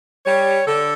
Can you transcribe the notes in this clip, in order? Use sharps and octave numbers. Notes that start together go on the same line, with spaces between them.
G3 C#5
D3 A4